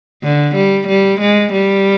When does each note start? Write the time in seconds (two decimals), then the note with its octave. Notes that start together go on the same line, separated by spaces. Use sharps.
0.23 D3
0.56 G3
0.88 G3
1.21 G#3
1.53 G3